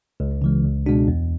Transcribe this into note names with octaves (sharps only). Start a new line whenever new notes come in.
C#2
C#3 E3 G#3
C#2
B2 G#3 D4 F#4
E2